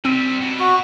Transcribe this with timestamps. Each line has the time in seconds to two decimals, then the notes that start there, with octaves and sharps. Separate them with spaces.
0.05 C3 G3 C4
0.41 B2
0.60 F#4